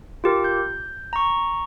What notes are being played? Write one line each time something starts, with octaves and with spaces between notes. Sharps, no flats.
F4 G4 A#4
G6
A#5 C#6